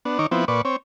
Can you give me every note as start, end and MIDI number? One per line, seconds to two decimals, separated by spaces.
0.05 0.18 59
0.05 0.18 62
0.19 0.27 51
0.19 0.27 63
0.19 0.27 73
0.19 0.27 86
0.31 0.45 53
0.31 0.45 59
0.31 0.45 60
0.31 0.45 64
0.48 0.62 46
0.48 0.62 71
0.48 0.62 74
0.48 0.62 85
0.65 0.76 60
0.65 0.76 73